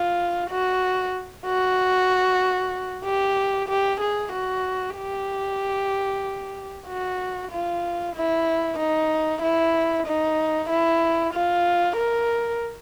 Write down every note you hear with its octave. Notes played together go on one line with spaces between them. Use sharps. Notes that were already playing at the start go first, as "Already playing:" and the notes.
Already playing: F4
F#4
F#4
G4
G4
G#4
F#4
G4
F#4
F4
E4
D#4
E4
D#4
E4
F4
A#4